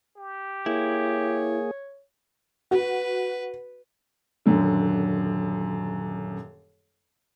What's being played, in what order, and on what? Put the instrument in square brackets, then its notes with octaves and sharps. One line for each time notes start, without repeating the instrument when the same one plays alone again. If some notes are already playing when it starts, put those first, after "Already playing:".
[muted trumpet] G4
[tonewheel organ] A#3 G#4 [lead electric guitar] E4 [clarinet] C#5
[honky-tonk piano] F#4 [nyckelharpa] B4
[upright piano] D#1 F#2 D3